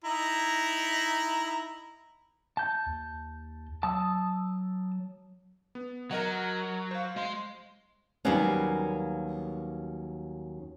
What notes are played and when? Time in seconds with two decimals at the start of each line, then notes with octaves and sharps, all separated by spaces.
0.04 D#4 E4 A#5
2.57 A5 G6
2.86 D#2
3.83 F#3 A5 D#6 E6
5.75 B3
6.11 F#3 A#4 D#5 F#5
6.91 C5 F5
7.16 G#3 C6
8.25 D#2 F#3 G3 A#3 B3 C#4